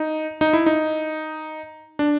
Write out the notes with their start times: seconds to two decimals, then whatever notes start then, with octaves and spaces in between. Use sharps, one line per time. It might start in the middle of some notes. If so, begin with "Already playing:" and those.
Already playing: D#4
0.41 D#4
0.53 E4
0.66 D#4
1.99 D4